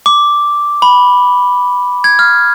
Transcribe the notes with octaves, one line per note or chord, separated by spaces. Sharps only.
D6
B5
G#6
F6